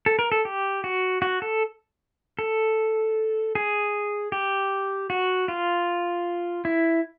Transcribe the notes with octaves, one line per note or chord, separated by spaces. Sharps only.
A4
A#4
A4
G4
F#4
F#4
A4
A4
G#4
G4
F#4
F4
E4